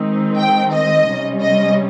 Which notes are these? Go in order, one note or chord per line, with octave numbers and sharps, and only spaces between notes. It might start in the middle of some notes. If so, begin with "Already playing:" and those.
Already playing: D#3 G#3 C4 D#4
G5
D#5
C3 G3 C#4
D#5